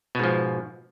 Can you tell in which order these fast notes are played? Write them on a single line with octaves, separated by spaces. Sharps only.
B2 G#2 F3